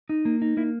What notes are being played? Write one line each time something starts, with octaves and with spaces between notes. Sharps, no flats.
D#4
A#3
D#4
A#3 E4